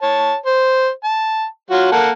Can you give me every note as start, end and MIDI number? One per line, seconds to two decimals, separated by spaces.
0.02 0.35 73
0.02 0.35 81
0.46 0.89 72
1.04 1.45 81
1.70 1.89 54
1.70 1.89 65
1.70 1.89 66
1.92 2.10 58
1.92 2.10 69
1.92 2.10 78